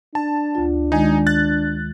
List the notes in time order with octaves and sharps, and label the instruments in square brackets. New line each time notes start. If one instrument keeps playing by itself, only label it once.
[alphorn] D4 [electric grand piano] A5
[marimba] D2 F4
[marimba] D#3 G#3 [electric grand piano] D#4 G#5
[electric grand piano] F#6 A6